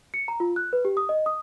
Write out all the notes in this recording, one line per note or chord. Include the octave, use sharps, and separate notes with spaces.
C#7
A#5
F4
F#6
B4
G4
D#6
D#5
D#6